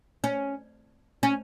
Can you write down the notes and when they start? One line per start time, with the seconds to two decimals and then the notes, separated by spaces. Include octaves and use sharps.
0.24 C#4
1.23 C#4